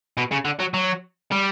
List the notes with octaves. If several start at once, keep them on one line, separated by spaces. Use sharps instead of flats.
B2
C#3
D3
F#3
F#3
G3